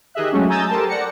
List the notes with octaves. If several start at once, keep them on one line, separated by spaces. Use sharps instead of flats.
D#3 G4 G#4 D#5 E5 F#6
F#3 G#3 A3 C#4 F#4
G#5 A#5 D#6 E6 G6 A6
G4 A4 A#4 C5 G5 A5
D5 F#5 A#6 C#7